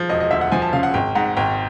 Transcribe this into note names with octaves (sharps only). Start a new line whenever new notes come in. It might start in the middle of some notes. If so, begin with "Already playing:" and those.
Already playing: F3
E1 D#5
D#5
D2 E5
F#5
F3 G#5
A5
C#3 F5
F#5
G#1 G5
G#2 F#5
G#1 G5